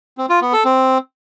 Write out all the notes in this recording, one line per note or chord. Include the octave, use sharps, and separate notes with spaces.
C4
F4
B3
A4
C4